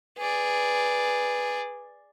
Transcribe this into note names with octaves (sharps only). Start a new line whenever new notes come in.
G#4 B4 D5